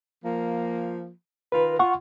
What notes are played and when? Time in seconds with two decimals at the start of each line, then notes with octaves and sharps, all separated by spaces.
0.24 F3 A#3
1.52 D#3 F4 A#4 B4
1.79 F4 F#5 C#6